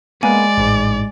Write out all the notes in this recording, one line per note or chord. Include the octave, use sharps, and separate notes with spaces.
G#3 A#3 B3 B4 D5 G#5
A1 G#2